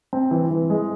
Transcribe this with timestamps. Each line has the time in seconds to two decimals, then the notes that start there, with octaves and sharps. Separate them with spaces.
0.13 C4
0.31 E3
0.51 E3
0.70 G#3